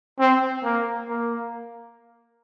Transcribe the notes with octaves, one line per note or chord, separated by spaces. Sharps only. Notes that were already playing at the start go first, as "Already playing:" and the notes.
C4
A#3
A#3